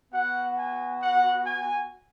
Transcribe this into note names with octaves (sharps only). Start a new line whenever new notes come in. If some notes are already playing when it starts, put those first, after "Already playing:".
B3 F#4 F#5
G#5
F#5
G#5